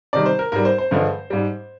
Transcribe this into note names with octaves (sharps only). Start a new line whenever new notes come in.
C3 D#3 G3 D5
C5
A#4
G#2 G3 A#4
C5
C5
G2 D3 F3 G#3
G#2 G3